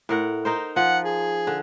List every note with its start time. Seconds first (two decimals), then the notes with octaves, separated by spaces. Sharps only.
0.09 A2 A#4 F#5
0.45 D#4 A#4 C5
0.76 F3 F#5
1.05 G#4
1.47 D3